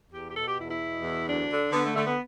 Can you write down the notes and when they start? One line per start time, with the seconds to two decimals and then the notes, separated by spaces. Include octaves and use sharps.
0.10 E2 G4
0.28 G4
0.34 B2 A4
0.45 G4
0.57 E2 E4
0.68 E4
0.79 B2
1.02 E2
1.26 D2 D4
1.49 D3
1.71 D3 B3
1.83 A3
1.94 D3 A3
2.06 B3